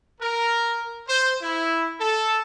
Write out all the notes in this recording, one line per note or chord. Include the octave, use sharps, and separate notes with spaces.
A#4
C5
E4
A4